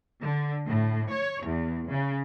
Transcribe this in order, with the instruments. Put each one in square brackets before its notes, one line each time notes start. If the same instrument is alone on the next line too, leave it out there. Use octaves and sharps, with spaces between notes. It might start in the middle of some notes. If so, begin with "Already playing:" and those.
[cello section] D3
A2
C#5
E2
C#3